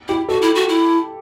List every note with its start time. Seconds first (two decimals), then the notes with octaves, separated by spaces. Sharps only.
0.08 E4 G4
0.29 F#4 A4
0.42 E4
0.55 F#4
0.69 E4